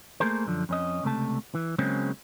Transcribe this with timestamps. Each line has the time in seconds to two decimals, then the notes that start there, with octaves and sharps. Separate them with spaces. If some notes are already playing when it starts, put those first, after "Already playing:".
0.20 A3 A#3 G#4 A#4 C5
0.46 F#2 D3 F3
0.69 F2 C#4 D#5
1.04 C#2 C3 A3 A5
1.55 E3
1.78 C#3 F#3 G#3 A#3 C4 C#4